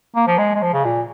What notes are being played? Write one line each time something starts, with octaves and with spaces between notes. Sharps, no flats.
A#3
F3
G#3
G#3
F3
C#3
A#2